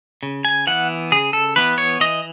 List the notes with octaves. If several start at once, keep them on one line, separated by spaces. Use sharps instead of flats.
C#3
G#5
E3 B3 F#5
C#3 G#4
A4
E3 B3 B4
C#5
E3 D#5